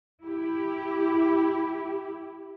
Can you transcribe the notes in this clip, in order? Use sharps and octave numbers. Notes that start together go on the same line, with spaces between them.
E4 G4